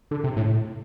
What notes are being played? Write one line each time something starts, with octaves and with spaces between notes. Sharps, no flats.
D3
C3
A2